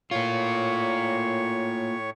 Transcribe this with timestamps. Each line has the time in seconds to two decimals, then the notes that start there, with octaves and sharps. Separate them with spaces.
0.11 A2 A#3 F4 C#5 C#6